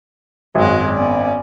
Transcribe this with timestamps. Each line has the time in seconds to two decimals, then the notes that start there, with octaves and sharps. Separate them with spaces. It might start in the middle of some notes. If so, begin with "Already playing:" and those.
0.55 G#1 F#2 F#3 G#3
0.92 B3 C#4 D5